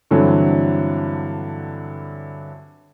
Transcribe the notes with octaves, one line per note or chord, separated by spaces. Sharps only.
G2 D3 E3 F#3 C4